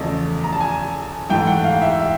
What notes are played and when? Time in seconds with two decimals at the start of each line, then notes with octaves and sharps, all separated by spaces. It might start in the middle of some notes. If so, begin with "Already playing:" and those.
Already playing: E2 C#3 F3 A3 D#5
0.44 A#5
0.53 A5
0.61 G#5
1.30 G#2 E3 A3 G5
1.47 F#5
1.64 F5
1.82 E5
1.99 E5